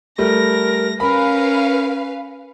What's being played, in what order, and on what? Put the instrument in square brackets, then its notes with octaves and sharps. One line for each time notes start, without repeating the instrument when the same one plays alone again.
[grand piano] G3 A3 [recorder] A#4 [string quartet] A#6
[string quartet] C#4 [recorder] A#4 [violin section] B4 F5 [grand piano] B5